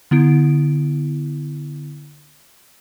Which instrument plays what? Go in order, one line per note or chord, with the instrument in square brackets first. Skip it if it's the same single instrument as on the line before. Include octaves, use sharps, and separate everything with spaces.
[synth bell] D3 B3 E4 D7